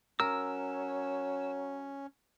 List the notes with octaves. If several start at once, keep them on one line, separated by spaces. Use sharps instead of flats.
F#3 C#4 A#4 E6